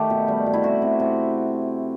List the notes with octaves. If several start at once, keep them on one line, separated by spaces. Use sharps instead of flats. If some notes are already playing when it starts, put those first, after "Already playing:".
Already playing: D#3 A3 G4
B2
G3
B2
E4
C3 F#4
C3
C3